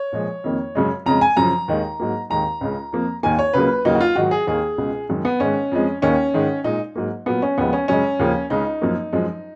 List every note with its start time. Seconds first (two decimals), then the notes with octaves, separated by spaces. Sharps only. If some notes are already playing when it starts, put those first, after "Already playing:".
Already playing: C#5
0.13 A#2 F3 G#3
0.44 F2 D#3 A#3
0.75 F#2 C#3 G#3
1.06 F2 C#3 G#3 A#5
1.21 G#5
1.37 F#2 C#3 F3 A#5
1.68 D#2 D#3 G#3
2.00 G#2 F#3 A#3
2.30 D#2 D#3 G#3 A#5
2.61 C#2 C#3 G#3
2.93 F2 F3 A#3
3.23 D#2 D#3 A#3 G#5
3.39 C#5
3.54 C#2 C#3 F#3 A#3 B4
3.85 D#2 C#3 F#3 A#3 D#4
3.95 F#4
4.01 F4
4.16 G#2 D#3 F#3 F#4
4.31 G#4
4.47 D#2 D#3 A#3 G#4
4.78 C#2 B2 G#3
5.09 F#2 D#3 G#3
5.25 B3
5.40 G#2 D#3 G#3 C#4
5.72 F2 F3 G#3
6.02 D#2 D#3 A#3 C#4
6.34 G#2 D#3 G#3
6.64 A#2 G#3 D#4
6.95 G#2 F#3 A#3
7.26 A#2 F#3 A#3 B3
7.42 C#4
7.58 D#2 C#3 F3 G#3 B3
7.73 C#4
7.88 F#2 C#3 G#3 C#4
8.19 D#2 C#3 F3 A#3
8.50 C#2 C#3 G#3 D#4
8.82 F#2 F3 A#3
9.13 F#2 F3 G#3